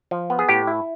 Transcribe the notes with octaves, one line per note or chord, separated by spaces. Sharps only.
F3
B3
G#4
A2 G4
E4